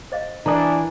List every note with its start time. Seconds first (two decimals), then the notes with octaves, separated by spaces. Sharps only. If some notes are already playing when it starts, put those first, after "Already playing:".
0.12 C5 D#5 F5
0.46 E3 D4 A#5 D#6